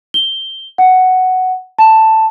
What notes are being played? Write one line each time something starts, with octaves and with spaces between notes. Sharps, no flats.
G7
F#5
A5